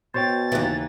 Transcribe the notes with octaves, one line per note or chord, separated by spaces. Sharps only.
B2 C5 C#5 G5 A6
D#2 C#3 E3